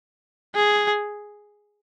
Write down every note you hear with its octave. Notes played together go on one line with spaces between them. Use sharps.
G#4